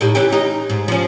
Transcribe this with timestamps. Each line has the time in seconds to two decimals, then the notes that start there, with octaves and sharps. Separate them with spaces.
0.01 A2 D#4 G4
0.15 E3 C#4 G4
0.32 D#4
0.70 G#2
0.88 F3 C#4